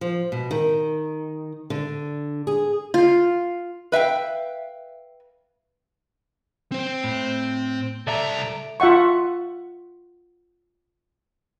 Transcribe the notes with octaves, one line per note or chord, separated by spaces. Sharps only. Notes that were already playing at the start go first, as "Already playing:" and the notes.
F3
B2
D#3
D3
G#4
F4
B4 E5 F5 G5
C4 C5
A2
C2 A4 D5 E5 A#5
F4 E5 F#5 C#6